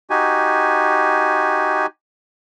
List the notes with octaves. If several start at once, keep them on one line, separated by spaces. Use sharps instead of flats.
D#4 F#4 G4 G#5